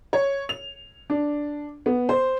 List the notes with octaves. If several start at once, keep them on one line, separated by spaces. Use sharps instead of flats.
C#5
F7
D4
B3
C5